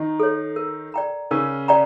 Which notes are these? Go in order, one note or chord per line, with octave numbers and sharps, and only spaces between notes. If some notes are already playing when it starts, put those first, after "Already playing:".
Already playing: D#3 D#4
A4 C#5
A#4
D5 G5 A#5
C#3 C#4 A#4
D5 G5 A#5